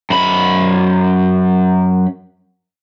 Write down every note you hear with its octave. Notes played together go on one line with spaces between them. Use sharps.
F#2 B5